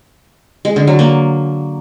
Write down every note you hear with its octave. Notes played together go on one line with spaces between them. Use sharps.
G#3
D3
F#3
A#3